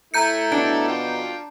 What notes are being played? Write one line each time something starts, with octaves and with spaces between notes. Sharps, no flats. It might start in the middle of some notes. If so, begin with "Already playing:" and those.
A3 E4 A#5 G6 C#7
B2 D4
F4 G5